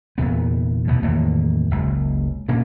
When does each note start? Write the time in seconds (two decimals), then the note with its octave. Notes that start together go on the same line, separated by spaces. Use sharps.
0.18 E2 A#2 B3
0.87 D2 B2 B3
1.02 E2 A2 D#3 A#3
1.71 F#1 C#2
2.48 A#2 A#3 C#4 D4